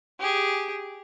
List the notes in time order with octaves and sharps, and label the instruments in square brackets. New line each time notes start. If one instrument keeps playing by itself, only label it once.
[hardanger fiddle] G4 G#4